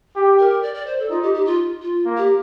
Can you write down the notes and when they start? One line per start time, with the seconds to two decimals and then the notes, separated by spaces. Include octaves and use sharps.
0.16 G4
0.39 A#4
0.63 D5
0.74 D5
0.87 C5
0.99 A4
1.10 D#4 F4
1.22 G4
1.34 G4
1.46 F4
1.82 F4
2.05 A#3
2.17 G4